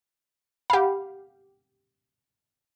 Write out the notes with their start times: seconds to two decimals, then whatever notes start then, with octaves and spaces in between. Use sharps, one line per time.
0.70 G4 F5 F#5 B5